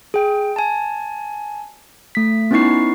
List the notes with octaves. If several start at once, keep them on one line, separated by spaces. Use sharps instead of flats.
G#4 G5
G#5 A5
A3 B6
B3 C#4 D#4 E4 C#6 C7